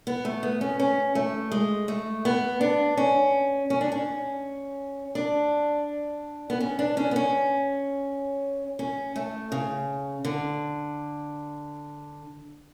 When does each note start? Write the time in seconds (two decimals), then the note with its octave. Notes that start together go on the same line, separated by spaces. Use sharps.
0.07 B3
0.25 A3
0.43 B3
0.61 C#4
0.80 C#4
1.15 A3
1.52 G#3
1.88 A3
2.25 B3
2.61 D4
2.97 C#4
3.70 C#4
3.81 D4
3.92 C#4
5.15 D4
6.50 B3
6.60 C#4
6.79 D4
6.97 C#4
7.11 B3
7.16 C#4
8.79 C#4
9.16 A3
9.52 C#3
10.25 D3